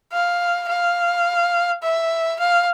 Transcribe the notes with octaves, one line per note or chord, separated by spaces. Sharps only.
F5
F5
E5
F5